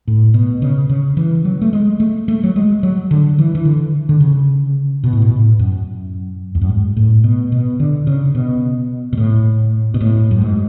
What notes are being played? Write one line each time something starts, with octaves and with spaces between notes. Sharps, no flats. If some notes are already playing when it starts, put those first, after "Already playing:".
A2
B2
C#3
C#3
E3
F#3
A3
G#3
A3
A3
F#3
G#3
F#3
D3
E3
E3
D3
D3
C#3
B2
A2
B2
A2
F#2
E2
F#2
G#2
A2
B2
B2
D3
C#3
B2
B2
A2
B2
A2
F#2
G#2